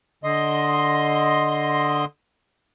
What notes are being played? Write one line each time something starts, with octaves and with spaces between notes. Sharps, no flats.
D3 D#5 C6